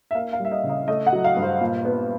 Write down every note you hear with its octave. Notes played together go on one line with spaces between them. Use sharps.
E5
A#3 F5
F5
G3
E5
D#5
C#3
D#5
A3 D#5
F#5
F#3
F5
G2
C5
A#2
B3